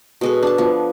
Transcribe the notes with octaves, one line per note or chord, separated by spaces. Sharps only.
B2 G#3 A4
D4 A5
F3 B3